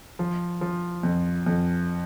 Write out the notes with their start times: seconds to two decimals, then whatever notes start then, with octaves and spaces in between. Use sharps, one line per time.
0.19 F3
0.61 F3
1.03 F2
1.46 F2